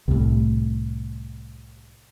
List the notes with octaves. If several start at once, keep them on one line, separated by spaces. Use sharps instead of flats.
C2 A2